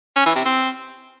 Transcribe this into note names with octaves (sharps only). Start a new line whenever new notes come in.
C#4
E3
C3
C4